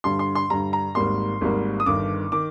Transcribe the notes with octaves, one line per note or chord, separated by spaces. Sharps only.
G2 D3 G3 C6
C6
C6
G2 D3 G3 A#5
A#5
G#1 G#2 G3 A#3 C6
G#1 G#2 G3 A#3
D#6
G1 G2 D#3 D6
D#3 D6